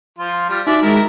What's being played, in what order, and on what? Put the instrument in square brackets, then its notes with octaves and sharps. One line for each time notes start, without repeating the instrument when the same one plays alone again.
[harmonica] F3 F4
G3 F4
[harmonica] D4 D5 E5 [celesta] D#4 F#4
[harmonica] D#3 E4 A#4 [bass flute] G#3